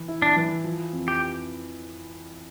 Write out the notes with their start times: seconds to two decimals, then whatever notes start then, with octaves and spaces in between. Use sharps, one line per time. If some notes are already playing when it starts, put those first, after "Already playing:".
Already playing: E3
0.08 E4
0.22 D4
0.36 E3
0.64 F3
0.93 F2
1.08 G4